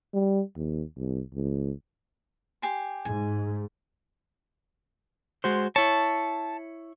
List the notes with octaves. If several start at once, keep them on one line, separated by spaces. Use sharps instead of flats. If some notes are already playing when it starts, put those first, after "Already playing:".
G3
D#2
C2
C#2
G4 G#5 C6
G#2 G#5
G#3 F#4 C5
E4 C#5 A5